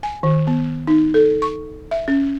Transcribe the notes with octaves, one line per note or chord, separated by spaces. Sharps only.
G#5
D#3
B3
D#4
A4
C#6
E5
C#4